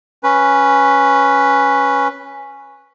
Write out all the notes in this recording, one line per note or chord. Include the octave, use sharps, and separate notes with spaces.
C#4 B4